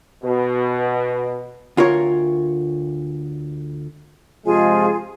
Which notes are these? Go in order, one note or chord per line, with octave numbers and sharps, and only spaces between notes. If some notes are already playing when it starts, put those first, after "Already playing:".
B2
D2 F4 A#4 C#5
C3 F3 G#3 F4 G#4 G#5